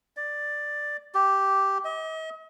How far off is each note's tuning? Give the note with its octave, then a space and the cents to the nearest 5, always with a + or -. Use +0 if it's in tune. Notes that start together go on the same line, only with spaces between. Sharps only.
D5 +5
G4 -5
D#5 +40